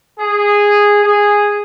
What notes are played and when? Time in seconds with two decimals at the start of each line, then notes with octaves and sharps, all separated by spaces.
0.19 G#4
1.04 G#4